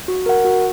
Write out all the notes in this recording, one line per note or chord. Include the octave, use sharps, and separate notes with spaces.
F#4
A#4 F#5
F#4